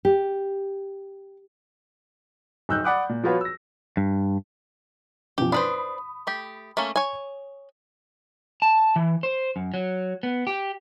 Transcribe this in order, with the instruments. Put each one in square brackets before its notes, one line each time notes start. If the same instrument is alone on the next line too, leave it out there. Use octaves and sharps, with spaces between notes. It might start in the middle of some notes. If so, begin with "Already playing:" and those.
[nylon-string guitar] G4
[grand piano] D1 D#4 E6 F#6 G6
D5 F#5 B5 D6 D#6 F#6
A#2
F3 B3 F4 F#4 B4 C#5
E6 A#6
[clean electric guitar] G2
[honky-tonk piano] F#2 B2 F3 [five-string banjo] G4
[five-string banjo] D4 B4 C5 [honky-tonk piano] B5 D#6 B6
[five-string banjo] A3 G4
A3 A#3 C#4
C#5 G#5
[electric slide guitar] A5
E3
C5
F#2
F#3
B3
G4